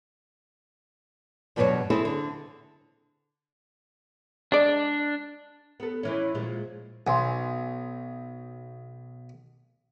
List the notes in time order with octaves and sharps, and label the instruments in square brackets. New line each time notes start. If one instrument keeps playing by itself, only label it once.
[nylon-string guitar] E2 G2 B2 F#3 B4 C#5
C4 E4 G#4 A4
D3
[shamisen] G#3 D5 [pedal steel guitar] D4
[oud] B3 A4
D#3 E3 C#4
A#2 F3 G#3
[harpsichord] B1 [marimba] G#5 C6